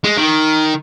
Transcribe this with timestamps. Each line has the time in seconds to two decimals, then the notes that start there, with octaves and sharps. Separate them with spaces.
0.04 G#3
0.17 D#3